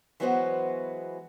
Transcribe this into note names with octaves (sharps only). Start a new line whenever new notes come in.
E3 F#3 G#3 B3 F#4 C5